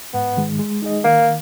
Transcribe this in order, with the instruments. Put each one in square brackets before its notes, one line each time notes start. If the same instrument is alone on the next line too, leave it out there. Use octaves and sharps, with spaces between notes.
[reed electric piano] G#2 [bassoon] B3
[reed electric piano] D#3 G#3
G#3
D#4 G#4 D#5
[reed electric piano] D#3 [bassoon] A#3